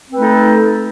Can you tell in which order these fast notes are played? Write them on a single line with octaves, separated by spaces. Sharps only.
C4 B4 A3 D#4 A4